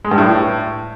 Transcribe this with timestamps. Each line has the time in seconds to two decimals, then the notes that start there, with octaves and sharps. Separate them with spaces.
0.05 G#3
0.11 G2
0.18 A2